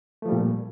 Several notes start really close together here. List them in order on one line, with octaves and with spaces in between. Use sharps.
A3 F3 G3 A#2